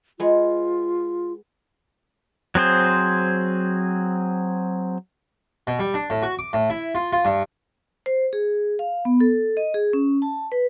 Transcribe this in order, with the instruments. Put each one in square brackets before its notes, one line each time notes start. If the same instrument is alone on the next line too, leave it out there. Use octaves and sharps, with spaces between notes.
[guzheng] G#3 B3 [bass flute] F4
[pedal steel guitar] F#3 C4 G#4 C5
[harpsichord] B2
G3
D4
A2
F#4
D6
A2
E4
F4
F4
G2
[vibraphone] C5
G#4
F5
B3
A4
D#5
G#4
C#4
A5
B4